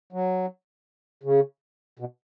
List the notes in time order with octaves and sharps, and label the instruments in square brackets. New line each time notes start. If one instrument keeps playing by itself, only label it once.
[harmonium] F#3
C#3
B2